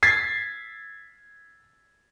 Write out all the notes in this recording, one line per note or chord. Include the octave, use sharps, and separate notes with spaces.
G#6 A6 B6 C7